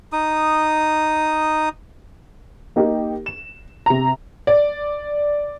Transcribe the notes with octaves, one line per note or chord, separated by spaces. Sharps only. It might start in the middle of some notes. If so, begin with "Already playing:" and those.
D#4 D#6
A#3 D#4 G4
E7
C3 A#5
D5